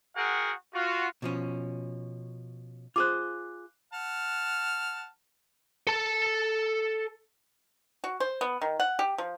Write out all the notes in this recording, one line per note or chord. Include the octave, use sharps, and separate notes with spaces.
F#4 G#4 A#4 F#5 G5
F4 F#4
B2 F3 C#4
F4 G#4 C5 D6 F#6
F#5 A5 F6
A4 A5
F#4
C5
B3
D#3
F#5
G4
F3